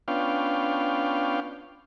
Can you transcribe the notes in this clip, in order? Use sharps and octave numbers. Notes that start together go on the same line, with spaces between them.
B3 C#4 D4 F4 F5 G5